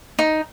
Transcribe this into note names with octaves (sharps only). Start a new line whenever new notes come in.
D#4